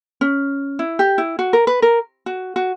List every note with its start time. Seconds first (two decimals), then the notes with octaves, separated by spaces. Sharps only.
0.21 C#4
0.79 E4
0.99 G4
1.18 E4
1.39 F#4
1.53 A#4
1.67 B4
1.82 A#4
2.26 F#4
2.56 F#4